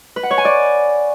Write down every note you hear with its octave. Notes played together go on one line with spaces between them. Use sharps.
B4
F#5
C#5
G#5
D5